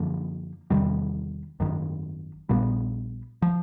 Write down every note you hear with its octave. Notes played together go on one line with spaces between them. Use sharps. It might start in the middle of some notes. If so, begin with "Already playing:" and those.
Already playing: F#2 D3 F3 A#3
E2 C3 D#3 G3
G#1 F#2 D#3
A#1 A#2 G3 B3
F3